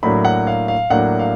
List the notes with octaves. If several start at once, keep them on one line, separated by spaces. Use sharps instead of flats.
A2 F#3 A#3 D4 B5
F#5
F5
F5
A2 F#3 A#3 D4 F#5
F5